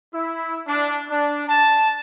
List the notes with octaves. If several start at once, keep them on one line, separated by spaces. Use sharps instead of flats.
E4
D4
D4
A5